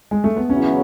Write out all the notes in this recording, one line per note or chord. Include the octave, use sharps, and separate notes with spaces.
G#3
A3
B3
E2 C#3 F#3 B3 C#4 E4